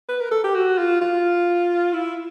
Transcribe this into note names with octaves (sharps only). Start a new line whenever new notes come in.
B4
A#4
A4
G4
F#4
F4
F4
E4